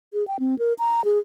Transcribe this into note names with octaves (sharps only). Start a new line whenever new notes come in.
G#4
G5
C4
A#4
A#5
G#4